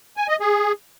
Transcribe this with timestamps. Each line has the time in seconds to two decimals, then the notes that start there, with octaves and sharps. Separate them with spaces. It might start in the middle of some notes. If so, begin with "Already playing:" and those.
0.17 G#5
0.29 D#5
0.40 G#4